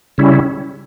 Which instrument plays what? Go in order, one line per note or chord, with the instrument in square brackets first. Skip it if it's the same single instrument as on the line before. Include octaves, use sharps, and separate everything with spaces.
[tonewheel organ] C#3 G3 C#4 E4